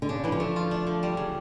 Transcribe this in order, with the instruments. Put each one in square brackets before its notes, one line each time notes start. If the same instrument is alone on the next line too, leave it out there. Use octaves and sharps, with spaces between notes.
[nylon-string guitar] D3
[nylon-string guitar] C#3 [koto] D4
[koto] D3 [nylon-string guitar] E3
[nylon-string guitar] F3
[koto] A3
F4
D4
D3
G3
C#3